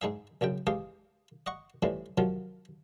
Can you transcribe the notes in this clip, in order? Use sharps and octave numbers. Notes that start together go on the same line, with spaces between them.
G#2 D#4 G#4 E5
A#1 F#2 C#3 G5
E2 G#3 G4 F5 D#6
D#5 F#5 C#6
F2 A2 E3 G3 C4
C3 D#3 F3 F#3 F4